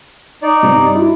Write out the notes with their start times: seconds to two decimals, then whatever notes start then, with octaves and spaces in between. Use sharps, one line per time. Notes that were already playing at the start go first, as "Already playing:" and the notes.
0.42 D#4 D5
0.63 G2 C3
0.95 E4 F#4